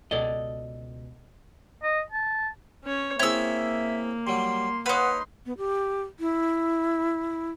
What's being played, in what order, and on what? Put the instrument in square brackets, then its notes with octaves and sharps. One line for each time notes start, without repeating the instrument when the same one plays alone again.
[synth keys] C#2 B2 [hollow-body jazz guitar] A4 D5 D#5
[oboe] D#5
A5
[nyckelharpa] C#4 C#5
[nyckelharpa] A#3 [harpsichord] C4 E4 G#4 [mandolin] C#5 E6 [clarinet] E5
[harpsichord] F#3 G3 [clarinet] C6
[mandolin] D#4 B4 [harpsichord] C#5 F5 [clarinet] F#5 [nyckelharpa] C6
[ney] B3
G4
E4